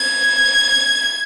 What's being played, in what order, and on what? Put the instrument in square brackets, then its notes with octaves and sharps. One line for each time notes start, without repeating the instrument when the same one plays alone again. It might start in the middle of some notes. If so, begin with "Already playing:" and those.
Already playing: [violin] G#6